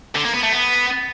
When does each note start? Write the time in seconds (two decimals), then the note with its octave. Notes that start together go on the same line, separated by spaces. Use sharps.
0.16 D3
0.25 A#3
0.34 B3
0.43 A3
0.52 B3